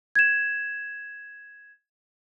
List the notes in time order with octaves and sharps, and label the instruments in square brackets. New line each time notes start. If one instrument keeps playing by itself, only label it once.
[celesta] G#6 E7